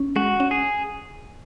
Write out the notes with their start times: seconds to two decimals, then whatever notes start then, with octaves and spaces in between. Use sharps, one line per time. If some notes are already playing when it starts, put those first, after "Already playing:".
Already playing: C#4
0.16 G#3 F#4
0.40 C#4
0.51 G#4